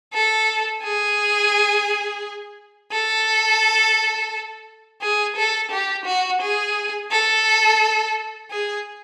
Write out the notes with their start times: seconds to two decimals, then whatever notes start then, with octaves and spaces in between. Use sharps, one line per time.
0.14 A4
0.83 G#4
2.92 A4
5.02 G#4
5.36 A4
5.71 G4
6.06 F#4
6.42 G#4
7.11 A4
8.51 G#4